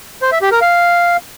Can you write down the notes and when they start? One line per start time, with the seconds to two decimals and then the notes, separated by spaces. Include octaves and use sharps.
0.22 C5
0.32 E5
0.42 G4
0.52 A#4
0.61 F5